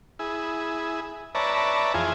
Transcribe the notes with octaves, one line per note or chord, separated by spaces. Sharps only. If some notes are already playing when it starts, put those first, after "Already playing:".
E4 G#4
B4 C#5 D5 E5 A5 A#5
F2 E3 F4 G#4 G#5